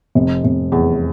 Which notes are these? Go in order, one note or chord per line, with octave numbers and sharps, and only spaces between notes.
F1
F1
E2